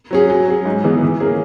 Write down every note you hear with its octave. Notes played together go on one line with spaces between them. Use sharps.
F#3 C#4 G#4
F#3
C#4 G#4
G#2
E3 B3 D#4 G#4
E3
A#3 C#4 G#4